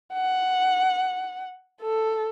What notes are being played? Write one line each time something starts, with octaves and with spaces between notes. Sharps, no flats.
F#5
A4